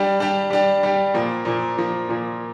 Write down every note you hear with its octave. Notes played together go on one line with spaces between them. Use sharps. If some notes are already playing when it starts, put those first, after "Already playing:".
Already playing: G3 D4 G4
G3 D4 G4
G3 D4 G4
G3 D4 G4
A#2 F3 A#3
A#2 F3 A#3
A#2 F3 A#3
A#2 F3 A#3